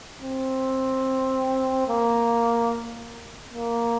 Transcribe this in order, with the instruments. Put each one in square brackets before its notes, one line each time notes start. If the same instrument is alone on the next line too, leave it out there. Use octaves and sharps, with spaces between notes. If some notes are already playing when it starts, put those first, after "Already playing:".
[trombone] C4
A#3
A#3